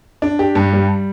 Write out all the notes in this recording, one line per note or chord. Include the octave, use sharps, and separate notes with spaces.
D4
G4
G2
G3